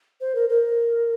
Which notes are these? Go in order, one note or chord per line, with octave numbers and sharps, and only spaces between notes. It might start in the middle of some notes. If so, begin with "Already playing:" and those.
C5
A#4
A#4